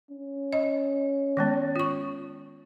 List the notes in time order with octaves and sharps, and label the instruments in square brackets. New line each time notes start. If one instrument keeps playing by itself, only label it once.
[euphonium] C#4
[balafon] D#5
D#3 G#3 B3
F4 C#6